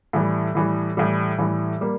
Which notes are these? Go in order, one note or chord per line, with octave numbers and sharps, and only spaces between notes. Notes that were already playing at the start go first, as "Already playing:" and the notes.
A2 E3 G3
A2 E3 G3
A2 E3 G3
A2 E3 G3
G3 A#3